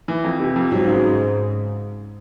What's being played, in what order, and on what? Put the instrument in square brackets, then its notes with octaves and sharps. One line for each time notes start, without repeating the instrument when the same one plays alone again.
[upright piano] E3
F2
C3
F2
[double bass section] G#2 [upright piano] F#3
[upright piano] C#3